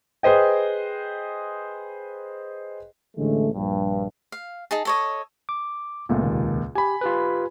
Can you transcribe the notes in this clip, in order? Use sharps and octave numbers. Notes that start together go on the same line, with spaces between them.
G#4 B4 C5 D#5 G5
A1 D3 G#3 A3
A#1 G2
F5
D#4 G#4 A5
A4 C#5 D#5
D6
C#2 A#2 A3 B3
D#2 C3 D#3
G4 G#5 B5
F4 G4 B4